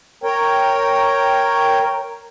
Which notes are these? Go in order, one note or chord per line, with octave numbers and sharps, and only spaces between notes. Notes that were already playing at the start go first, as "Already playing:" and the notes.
A#4 C#5 G5